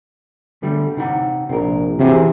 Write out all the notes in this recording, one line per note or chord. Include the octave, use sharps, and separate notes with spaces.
D3 G3 A3
C3 D#4 F#5
A#1 C3 A#4
C3 E3 F#4 G#4